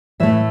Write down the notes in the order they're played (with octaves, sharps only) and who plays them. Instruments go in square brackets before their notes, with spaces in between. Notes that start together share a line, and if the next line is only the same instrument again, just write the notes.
[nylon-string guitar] A2 E3 A3 E5